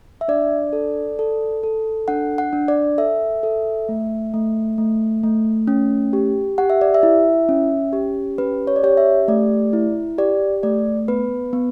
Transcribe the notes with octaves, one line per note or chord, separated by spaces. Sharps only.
E5
D4 D5
A4
A4
A4
D4 F#5
F#5
D4
D5
A4 E5
A4
A3
A3
A3
A3
C#4
G4
G4 F#5
E5
D5
E5
E4
C#4
G4
C#4 B4
C#5
D5
G4 C#5
E5
A3 D5
E4
G4 D5
A3 D5
B3 B4
B3